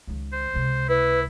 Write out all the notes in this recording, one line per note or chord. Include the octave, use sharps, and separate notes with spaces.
C#2 D#3
C5
C#2 C3
E4 B4